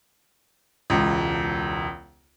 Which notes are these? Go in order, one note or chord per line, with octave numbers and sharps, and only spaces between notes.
E1 C#2